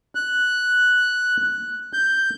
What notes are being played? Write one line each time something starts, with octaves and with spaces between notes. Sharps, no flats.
F#6
G6